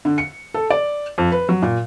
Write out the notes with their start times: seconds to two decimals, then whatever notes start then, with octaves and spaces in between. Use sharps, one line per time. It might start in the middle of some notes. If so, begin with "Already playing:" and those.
0.05 D3
0.18 C#7
0.54 A4
0.70 D5
1.18 F2
1.32 B4
1.49 F#3
1.62 A#2